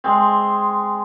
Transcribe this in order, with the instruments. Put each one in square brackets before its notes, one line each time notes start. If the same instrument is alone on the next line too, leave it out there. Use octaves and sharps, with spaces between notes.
[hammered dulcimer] G#3 C4